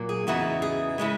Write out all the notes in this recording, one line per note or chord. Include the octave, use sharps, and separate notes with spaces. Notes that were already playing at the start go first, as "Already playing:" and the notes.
Already playing: A#2 F#3 A#3
G#4
E2 C#3 E3 B3 D#4 F#4
G#4
C#3 G#3 C#4 E4